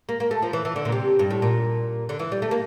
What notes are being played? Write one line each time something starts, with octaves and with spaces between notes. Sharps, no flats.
A#3
A#3
A3
F3
E3
E3
D3
A#2
C3
G2
A2
A#2
D3
E3
G3
A3
A#3